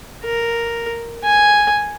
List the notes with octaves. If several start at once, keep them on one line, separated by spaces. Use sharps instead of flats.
A#4
G#5